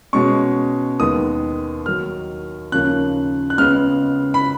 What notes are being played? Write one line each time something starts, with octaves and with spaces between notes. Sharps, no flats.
B2 G#3 C#4 C#6
D#2 D#3 G#3 B3 D#6
D#2 D#3 F#3 F6
D#2 C#3 F3 A#3 C#4 F#6
F#6
C#2 C#3 G#3 B3 F6
B5